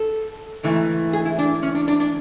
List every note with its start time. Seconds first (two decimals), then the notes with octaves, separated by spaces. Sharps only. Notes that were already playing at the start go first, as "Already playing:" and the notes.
Already playing: A4
0.63 G#2 E3 A3
1.13 G#4
1.25 E4
1.38 D4
1.63 C#4
1.75 D4
1.88 D4
2.00 D4